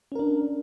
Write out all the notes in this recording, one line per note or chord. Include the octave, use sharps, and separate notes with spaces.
C#4 D4 A#4